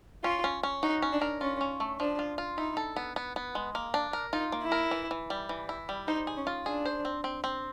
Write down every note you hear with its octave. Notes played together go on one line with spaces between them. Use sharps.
C#4 F4
C#4
C#4
D#4 F#4
C#4
D4
A#4
C#4 F4
C#4
A3
F3 D4
F4
F4
D#4 E4
A4
B3
B3
B3
G#3
A#3
D4
A#4
D#4 F4
A#3
E4
A#4
E3
E3
G3
E3
E4
G3
D#4 C5
G#4
C#4
F4
D4 G#4
C5
C4
C4
C4